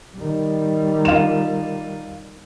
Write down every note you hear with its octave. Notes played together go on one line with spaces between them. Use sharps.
D#3 G3
F4 E7